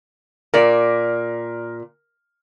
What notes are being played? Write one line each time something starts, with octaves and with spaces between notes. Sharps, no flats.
A#2 A#4 D5